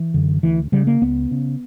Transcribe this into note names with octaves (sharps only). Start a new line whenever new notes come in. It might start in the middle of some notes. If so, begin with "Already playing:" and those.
Already playing: E3
F#2 D3
D2 E3
C#3 G3
A#3
C#2 B3
C#3